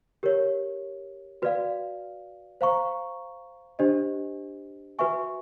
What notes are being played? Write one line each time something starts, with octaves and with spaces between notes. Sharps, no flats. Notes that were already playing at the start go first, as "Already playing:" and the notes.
G4 A#4 C#5
F#4 B4 D5 F5
C5 F5 A#5 C#6
D4 G4 C5 D#5
F#4 B4 E5 G#5 C#6